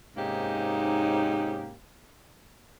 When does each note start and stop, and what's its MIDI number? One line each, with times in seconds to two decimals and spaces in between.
0.17 1.74 44
0.17 1.74 48
0.17 1.74 58
0.17 1.74 61
0.17 1.74 63
0.17 1.74 67